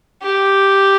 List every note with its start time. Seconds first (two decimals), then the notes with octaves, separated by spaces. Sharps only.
0.22 G4